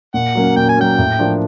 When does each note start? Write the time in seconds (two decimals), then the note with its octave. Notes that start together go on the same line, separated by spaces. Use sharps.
0.14 A#2 F#5
0.35 F#3 A#3 C#4
0.56 A#2 G5
0.69 G#5
0.77 F#3 A#3 C#4 G5
0.98 A2
1.19 F3 A#3 D4